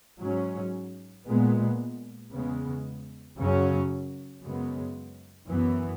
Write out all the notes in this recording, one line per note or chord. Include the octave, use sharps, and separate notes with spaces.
G#2 F#3 C#4
A#2 G#3 B3
E2 C#3 G#3 B3
F#2 C#3 F#3 C#4
F#2 C#3 G#3 B3
F#2 E3 B3